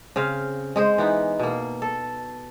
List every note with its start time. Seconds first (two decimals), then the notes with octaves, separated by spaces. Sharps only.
0.16 C#3 C4 F5
0.76 G#3 G#4 C5
0.98 E3 B3 D#4
1.39 B2 A#3
1.82 A4